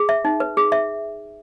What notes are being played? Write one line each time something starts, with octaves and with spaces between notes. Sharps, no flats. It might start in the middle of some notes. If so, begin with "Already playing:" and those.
Already playing: G#4
E5
D#4
B4
G#4
E5